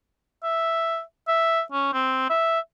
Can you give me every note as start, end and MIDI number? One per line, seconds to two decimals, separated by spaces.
0.43 1.01 76
1.28 1.62 76
1.72 1.92 61
1.93 2.26 60
2.30 2.59 76